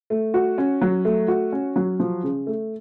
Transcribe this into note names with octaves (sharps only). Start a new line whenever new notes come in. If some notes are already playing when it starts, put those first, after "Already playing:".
A3
F#4
C#4
F#3
A3
F#4
C#4
F#3
F3
C#3
A3